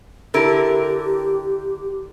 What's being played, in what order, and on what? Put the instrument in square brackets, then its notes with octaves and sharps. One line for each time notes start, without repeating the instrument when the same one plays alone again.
[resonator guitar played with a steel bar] D3 E4 A#4 [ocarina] G4